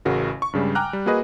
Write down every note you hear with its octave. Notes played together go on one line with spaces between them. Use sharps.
A1 C#3 F#4 A#4
C#6
G2 C#3 G3 G#3
G5 G#5 A#5 D6 F6 F#6
G3
A#3 F#4 G#4 B4 D#5